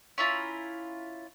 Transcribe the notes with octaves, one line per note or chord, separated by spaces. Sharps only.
C#4 E4 F4 A#5